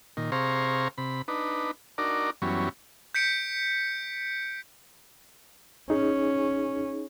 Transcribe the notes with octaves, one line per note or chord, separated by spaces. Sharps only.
A#2 D#3
C3 G#4 C5 F5 A#5 C#6
C3 B5
D4 D#4 B4
D4 D#4 F#4 A#4 D5
F#2 E3 F#3 G3 B3 C#4
G6 B6 C#7 D7
C#4 D#4 G#4